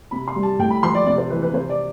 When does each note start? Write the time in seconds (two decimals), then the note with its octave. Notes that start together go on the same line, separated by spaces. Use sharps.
0.11 C3 B5
0.28 C6
0.36 G3
0.43 A5
0.59 A2 G5
0.70 B5
0.83 F3 C6
0.95 D5
1.06 C3 D5
1.18 C5
1.30 E3 B4
1.42 B4
1.53 C3 C5
1.69 D5